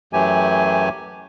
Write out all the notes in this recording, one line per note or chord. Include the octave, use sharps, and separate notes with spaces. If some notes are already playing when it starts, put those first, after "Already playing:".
F#2 E3 F#3 A3 G4 G#5